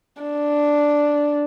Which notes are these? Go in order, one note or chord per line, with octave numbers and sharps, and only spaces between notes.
D4